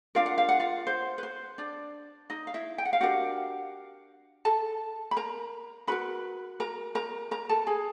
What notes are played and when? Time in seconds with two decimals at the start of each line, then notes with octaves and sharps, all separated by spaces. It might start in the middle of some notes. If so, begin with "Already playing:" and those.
0.15 D4 F4 A#4 F5
0.26 F#5
0.38 F5
0.49 F#5
0.60 F4 F5
0.87 C5
1.18 B4
1.23 C5
1.58 D4 D5
2.30 D#4 D#5
2.47 F5
2.54 E4 E5
2.78 G5
2.85 F#5
2.93 F5
3.00 D4 F#4 G4 A#4 F#5
4.45 A4 A5
5.11 B5
5.16 A#4 A#5
5.87 D#4 F#4 A#4 B4 B5
6.60 A#4 A#5
6.95 A#4 A#5
7.31 A#4 A#5
7.49 A4 A5
7.67 G#4 G#5